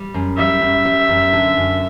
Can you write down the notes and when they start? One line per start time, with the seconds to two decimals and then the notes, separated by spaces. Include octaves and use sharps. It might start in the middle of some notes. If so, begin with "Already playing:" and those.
Already playing: G3
0.14 F#2
0.38 G3 E5
0.61 F#2
0.85 G3
1.10 F#2
1.33 D3
1.57 F#2